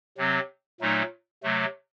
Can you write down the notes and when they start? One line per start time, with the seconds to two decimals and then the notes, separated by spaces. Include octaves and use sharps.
0.17 C3 F#3 C4
0.80 A#2 F#3 A3 D#4
1.43 C3 F#3 A3